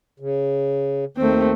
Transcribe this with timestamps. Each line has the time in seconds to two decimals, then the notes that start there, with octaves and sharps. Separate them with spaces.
0.20 C#3
1.17 D#2 D#3 A3 C4